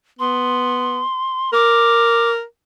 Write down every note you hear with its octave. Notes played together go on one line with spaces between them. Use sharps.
B3 C6
A#4 D6